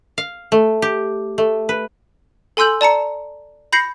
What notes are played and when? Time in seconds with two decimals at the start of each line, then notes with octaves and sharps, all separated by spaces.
0.18 F5
0.52 A3
0.82 G4
1.38 A3
1.69 B4
2.57 A4 G#5 C6 E6 G6 F#7
2.81 D5 A5 A#5 C#7
3.73 B5 G6 A#6 C7 C#7